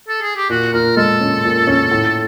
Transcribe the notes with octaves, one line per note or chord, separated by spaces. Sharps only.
A4
G#4
G4
A#2 F#4
A#2 A#4
G#3 A4
C#4
A#2
C#4
A2